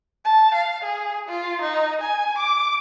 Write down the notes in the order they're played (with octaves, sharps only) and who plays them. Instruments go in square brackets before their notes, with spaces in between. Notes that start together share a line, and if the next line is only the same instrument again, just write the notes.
[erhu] A5
F5
G#4
F4
D#4
G#5
D6